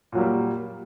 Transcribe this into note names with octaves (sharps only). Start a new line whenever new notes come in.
A#2 F#3 G3 A#3